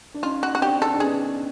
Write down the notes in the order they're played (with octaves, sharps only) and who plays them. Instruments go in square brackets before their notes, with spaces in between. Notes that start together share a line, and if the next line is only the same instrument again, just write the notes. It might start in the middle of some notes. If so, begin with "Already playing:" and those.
[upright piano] D4
[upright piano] C#4 D#4 [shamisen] F4
[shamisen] F#4
F#4
[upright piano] C4 D4 [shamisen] G4
[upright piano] D#4 [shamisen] A4
[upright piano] D4
[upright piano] B3 C#4 [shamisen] G#4